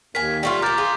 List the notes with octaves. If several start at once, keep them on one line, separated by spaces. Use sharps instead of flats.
D#2 A#3 G#5 B6
G3 A3 F4
A#2 A#3 A#5 D6 G6 A6
F4 G#4